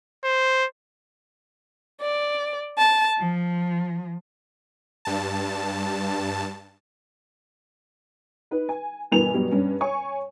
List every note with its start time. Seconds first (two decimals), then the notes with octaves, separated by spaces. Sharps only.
0.24 C5
2.00 D5
2.77 A5
3.18 F3
5.05 G2 A5
8.51 D#4 B4
8.69 G#5
9.12 G2 B2 E3 A#4 G#5 F7
9.34 G2 B2 F#3 G3
9.51 G2 C#4
9.81 C#5 G#5 C#6